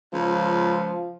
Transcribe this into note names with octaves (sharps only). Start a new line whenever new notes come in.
C#2 F3